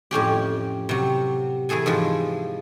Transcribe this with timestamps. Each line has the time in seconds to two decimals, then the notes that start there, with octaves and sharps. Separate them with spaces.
0.11 F2 A2 C#4 G4
0.89 C3 F#3
1.69 E3 A3 G#4 A4 G#5
1.86 G#2 E3 F3